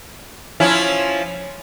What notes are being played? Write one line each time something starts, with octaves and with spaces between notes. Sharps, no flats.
F3 C#4 E4